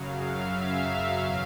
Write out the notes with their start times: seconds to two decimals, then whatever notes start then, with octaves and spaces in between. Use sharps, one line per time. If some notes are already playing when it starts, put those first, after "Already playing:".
Already playing: F#2 C#3 F#3 F5
0.30 E5
0.72 F5
1.14 E2 B2 F#3 F5